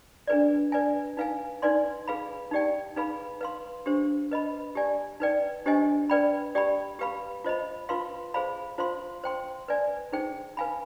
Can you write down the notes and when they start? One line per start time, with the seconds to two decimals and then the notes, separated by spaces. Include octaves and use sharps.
0.27 D4 G#4 B4 D5
0.72 B4 D5 G#5
1.17 D#4 B4 F5 G#5
1.62 D#4 B4 D5 G#5 C6
2.08 G#4 B4 F5 B5
2.51 D#4 G4 D5 G5
2.96 D#4 G#4 B4 F5 B5
3.41 B4 F5 C6
3.86 D4 G4 C5
4.31 B4 D#5 B5
4.75 G4 D5 G#5
5.20 D#4 B4 D5 G5
5.66 D4 G4 C5 D#5 G#5
6.10 B4 D5 G5 B5
6.55 G4 D5 G5 B5
6.99 G4 B4 F5 B5
7.44 F4 C5 D#5 B5
7.89 F4 B4 F5 C6
8.34 G#4 C5 F5 B5
8.78 F4 C5 F5 C6
9.24 C5 G5 C6
9.68 B4 D5 G#5
10.12 D#4 G#4 C5 G5
10.57 B4 F5 G#5 B5